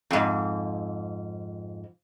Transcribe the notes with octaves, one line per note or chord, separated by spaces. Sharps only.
F2 G#2